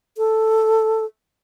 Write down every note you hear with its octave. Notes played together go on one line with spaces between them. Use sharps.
A4